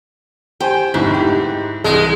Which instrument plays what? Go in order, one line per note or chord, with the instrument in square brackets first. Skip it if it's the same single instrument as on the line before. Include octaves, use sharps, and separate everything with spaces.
[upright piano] G4 C5 G#5 [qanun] G5
[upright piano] F1 D2 G#2 [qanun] E4
[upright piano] G#2 G4
[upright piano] C2 E3 [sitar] G#3